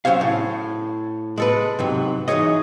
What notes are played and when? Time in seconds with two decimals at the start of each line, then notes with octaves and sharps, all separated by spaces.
0.05 F#3 C#4 C5 C#5 F5
0.21 A2
1.38 G#3 A4 B4
1.79 G#2 C3 F#3
2.28 E3 D#4 G#4 C#5 D#5